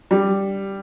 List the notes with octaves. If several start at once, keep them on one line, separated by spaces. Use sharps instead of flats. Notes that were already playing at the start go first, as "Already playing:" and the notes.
G3